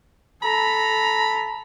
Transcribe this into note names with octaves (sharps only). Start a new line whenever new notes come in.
A4 A#5 B5